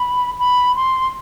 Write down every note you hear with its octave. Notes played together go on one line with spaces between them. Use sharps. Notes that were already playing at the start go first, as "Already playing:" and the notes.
Already playing: B5
B5
C6